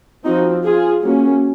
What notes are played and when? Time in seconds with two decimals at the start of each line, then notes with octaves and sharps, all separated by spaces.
0.25 F3 C4 D#4 F#4
0.63 F4 G#4
1.02 F#3 A#3 C#4